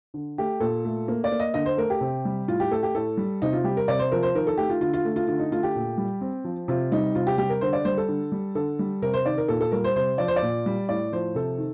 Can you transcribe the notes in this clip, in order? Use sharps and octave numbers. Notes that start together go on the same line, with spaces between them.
D3
A3 G4
A#2 A4
A3
A#3
D5
A#3
D#5
D3 D#5
C5
A3 A#4
G4
C3
G3
A2 F4
G4
A3 A4
G4
A2 A4
G3
C3 D#4
F4
G3 G4
A#4
C3 D5
C5
F3 A#4
C5
D#3 A#4
A4
A3 G4
F4
D3 F4
F4
A3
F4
D3 F4
D#4
A3 F4
G4
A#2
G3
C4
F3
C3 F4
G3 D#4
C3 F4
G4
G3 G4
A#4
D3 C5
D5
G3 C5
A4
D3
G3
D3 A4
G3
C3 A#4
C5
D#3 D5
A#4
A#2 A4
A4
G3 A#4
C5
C3 C5
F3 D5
C5
D5
A#2
G3
A2 D5
F3 C5
C3 A4
D#3